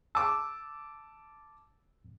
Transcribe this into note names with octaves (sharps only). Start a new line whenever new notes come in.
A5 D6 E6